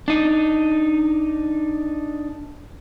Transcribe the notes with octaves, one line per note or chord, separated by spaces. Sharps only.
D4 D#4